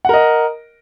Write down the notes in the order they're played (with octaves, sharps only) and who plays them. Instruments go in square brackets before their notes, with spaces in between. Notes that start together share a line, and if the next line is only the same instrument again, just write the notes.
[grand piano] F#5
A#4
D#5